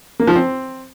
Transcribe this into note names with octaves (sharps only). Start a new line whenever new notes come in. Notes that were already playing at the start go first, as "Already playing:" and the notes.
A#3
F3
C4